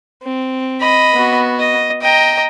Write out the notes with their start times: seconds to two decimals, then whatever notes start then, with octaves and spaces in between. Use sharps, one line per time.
0.23 C4
0.80 D#5 B5
1.13 B3 F#4
1.59 D#5
2.02 D#5 G5 A#5